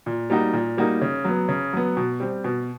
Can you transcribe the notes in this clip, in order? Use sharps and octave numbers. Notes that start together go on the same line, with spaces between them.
A#2
G3 A#3 D#4 F#4
A#2
G3 A#3 D#4 F#4
C#3
F#3 B3
C#3
F#3 B3
B2
G3 C4
B2